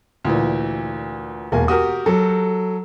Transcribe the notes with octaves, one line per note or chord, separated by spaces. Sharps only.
D2 A#2 E3
E1 A#3 G#5
F#4 G4 A#4 D#6
F#3 A4